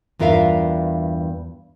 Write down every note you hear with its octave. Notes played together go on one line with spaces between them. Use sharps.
E2 G2 F4 A#4 E5 F5